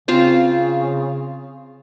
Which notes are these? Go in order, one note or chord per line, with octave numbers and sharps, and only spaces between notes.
C#3 C4 F4 F5